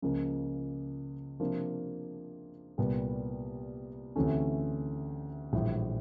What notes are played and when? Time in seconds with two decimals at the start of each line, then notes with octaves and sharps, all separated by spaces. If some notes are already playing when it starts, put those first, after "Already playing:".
0.02 C#2 C#3 F3 A#3
1.40 C3 F3 A#3 D4
2.78 C2 A#2 G3 B3
4.16 D2 C3 E3 A3 C#4
5.53 A#1 A2 E3 G3